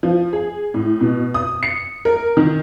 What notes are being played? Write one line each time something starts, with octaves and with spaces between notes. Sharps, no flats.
F3
G#4
A2
B2
D#6
C#7
A#4
D#3